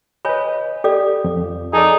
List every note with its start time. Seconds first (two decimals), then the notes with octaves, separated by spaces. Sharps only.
0.25 B4 C#5 D#5 G#5 B5
0.84 G4 A4 D5
1.24 F2
1.73 D#4 G#4 A4 D5